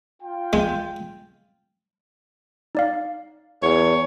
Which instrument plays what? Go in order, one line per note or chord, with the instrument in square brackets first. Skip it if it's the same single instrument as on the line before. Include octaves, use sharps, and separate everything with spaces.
[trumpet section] F4 G5
[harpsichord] G#3
[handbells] D#4 D5 F5
[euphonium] E2 [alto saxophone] C#5